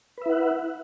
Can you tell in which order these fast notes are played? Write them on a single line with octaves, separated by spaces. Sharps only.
B4 E5 E4 F#5